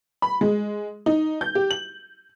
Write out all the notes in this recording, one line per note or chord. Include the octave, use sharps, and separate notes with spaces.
B5
G#3
D#4
G6
G4
F#7